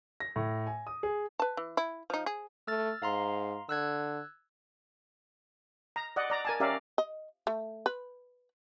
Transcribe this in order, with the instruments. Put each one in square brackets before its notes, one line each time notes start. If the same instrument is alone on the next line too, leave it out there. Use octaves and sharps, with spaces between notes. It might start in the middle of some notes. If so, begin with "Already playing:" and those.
[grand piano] A#6
A2
G#5
D#6
G#4
[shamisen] B4 A5
E3
E4
F3 D#4
G#4
[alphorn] A3 [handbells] E6 F6 A6
[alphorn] G#2 [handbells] F5 A#5 C6
[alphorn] D3 [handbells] E6 F#6 G#6
[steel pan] A#5
D5 D#5 F#5
D5 A#5
A#4 G#5 A5
C#4 G4 A#4 D5 E5 F5
[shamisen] D#5
A3
B4